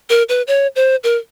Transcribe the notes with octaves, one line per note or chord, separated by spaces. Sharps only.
A#4
B4
C#5
C5
A#4